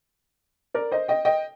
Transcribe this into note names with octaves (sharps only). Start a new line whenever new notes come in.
A#4 D5
C5 D#5
D#5 G5
D#5 G5